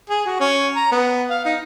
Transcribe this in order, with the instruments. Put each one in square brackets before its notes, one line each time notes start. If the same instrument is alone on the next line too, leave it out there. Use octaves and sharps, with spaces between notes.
[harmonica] G#4
F#4
C#4
A#5
B3
F5
D#4